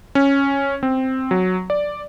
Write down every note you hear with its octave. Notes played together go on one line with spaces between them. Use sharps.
C#4
C4
F#3
D5